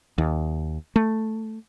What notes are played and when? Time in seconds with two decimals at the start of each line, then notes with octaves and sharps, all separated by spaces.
0.18 D#2
0.96 A3